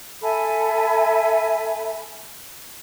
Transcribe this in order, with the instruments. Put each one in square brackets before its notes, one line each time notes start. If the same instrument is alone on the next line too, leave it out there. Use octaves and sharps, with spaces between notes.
[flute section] A4 E5 G#5 B5